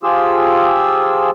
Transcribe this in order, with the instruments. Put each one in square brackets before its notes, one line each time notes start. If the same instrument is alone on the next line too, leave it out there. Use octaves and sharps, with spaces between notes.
[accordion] F3 F4 G4 G#4 E6